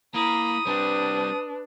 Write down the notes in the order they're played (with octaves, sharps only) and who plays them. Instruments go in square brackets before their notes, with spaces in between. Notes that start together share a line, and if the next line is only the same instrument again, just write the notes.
[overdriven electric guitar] A#3 [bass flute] E4 [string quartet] A#5 B5 [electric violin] D#6
[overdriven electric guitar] G3 C4 [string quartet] D4 [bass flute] B4